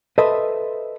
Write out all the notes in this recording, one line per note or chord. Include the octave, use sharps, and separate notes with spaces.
A4 B4 C5 D#5 E5